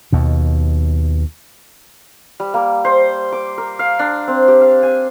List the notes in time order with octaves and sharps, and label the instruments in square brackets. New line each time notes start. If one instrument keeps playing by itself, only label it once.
[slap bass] D#2 B2
[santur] G3
A#3
C5
D6
A#4
F5
D4
C4
G4
F5
G#5